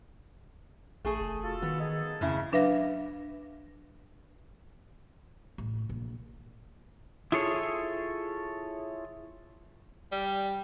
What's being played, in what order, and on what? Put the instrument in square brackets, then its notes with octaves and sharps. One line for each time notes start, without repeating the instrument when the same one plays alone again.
[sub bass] A1 [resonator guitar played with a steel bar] A3 G#4
[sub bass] F1
[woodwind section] F4 F#4 A4
[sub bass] D#3 [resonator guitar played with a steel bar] B3
[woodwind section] D#4 G#4 A4
[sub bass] F2 [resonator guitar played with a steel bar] A2 C#3 E4
[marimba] F#3 D4 B4 E5 F5 A#6
[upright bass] A1
A#1
[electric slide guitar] E4 F4 G#4 A4 C#5
[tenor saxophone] G3